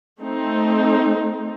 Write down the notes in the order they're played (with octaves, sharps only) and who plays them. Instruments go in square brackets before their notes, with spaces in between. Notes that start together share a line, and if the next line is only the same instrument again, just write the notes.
[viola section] A3 C4 D#4